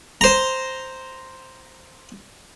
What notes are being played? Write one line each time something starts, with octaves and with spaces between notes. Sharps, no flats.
C5 A#5